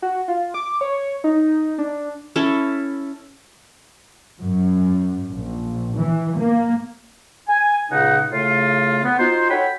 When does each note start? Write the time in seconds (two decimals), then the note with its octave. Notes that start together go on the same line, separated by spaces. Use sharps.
0.02 F#4
0.28 F4
0.54 D6
0.81 C#5
1.24 D#4
1.78 D4
2.36 C#4 E4 A4
4.42 F#2
5.31 A#1
5.99 E3
6.39 A#3
7.48 G#5
7.91 C#2 A#2 C#3 D#4 F#5
8.31 A2 C#3 A3 F4
9.03 B3
9.19 D#4 F4 F#4 C5
9.50 F#4 A4 C#5 G5 B5